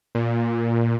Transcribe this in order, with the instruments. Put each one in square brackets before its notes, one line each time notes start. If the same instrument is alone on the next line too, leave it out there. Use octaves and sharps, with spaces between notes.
[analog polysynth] A#2